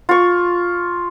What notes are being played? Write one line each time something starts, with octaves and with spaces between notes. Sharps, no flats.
F4 C#6